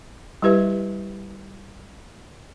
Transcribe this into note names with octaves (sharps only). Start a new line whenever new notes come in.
G3 E4 G4 B4 E5